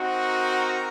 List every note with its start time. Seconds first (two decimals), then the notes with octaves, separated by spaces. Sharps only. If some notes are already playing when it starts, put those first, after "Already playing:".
Already playing: C4 D#4 F#4
0.14 A#4